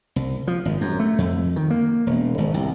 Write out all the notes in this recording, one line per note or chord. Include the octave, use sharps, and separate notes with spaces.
C2
F3
G#1
F#2
A3
F2
D#3
A#3
E1
G#1
C2